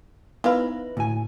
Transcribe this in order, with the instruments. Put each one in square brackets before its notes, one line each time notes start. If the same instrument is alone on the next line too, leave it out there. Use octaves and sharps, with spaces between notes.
[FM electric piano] B3 D#4 B4 [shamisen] E4 C5 F5
[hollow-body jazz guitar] D2 G#5 [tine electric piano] A2